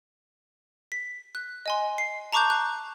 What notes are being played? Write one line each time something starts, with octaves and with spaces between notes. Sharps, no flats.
B6
F#6
D#5 G#5 C6
C7
A5 A#5 C#6 D6 F#6 G6
F#6